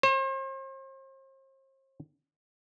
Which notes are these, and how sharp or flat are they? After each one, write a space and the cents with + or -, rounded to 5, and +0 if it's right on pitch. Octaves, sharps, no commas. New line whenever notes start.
C5 +40